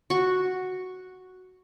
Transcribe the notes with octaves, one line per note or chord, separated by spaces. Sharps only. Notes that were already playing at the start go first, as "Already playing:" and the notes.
F#4 C#6